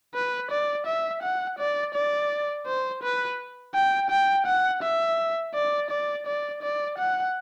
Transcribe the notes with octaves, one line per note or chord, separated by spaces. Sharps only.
B4
D5
E5
F#5
D5
D5
C5
B4
G5
G5
F#5
E5
D5
D5
D5
D5
F#5